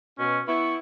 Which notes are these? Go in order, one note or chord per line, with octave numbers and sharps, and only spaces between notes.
B2 C#4
B3 E4 C#6